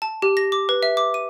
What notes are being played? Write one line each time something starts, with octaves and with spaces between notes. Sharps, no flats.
A5
G4
A#6
D6
B4
E5
D6
D#7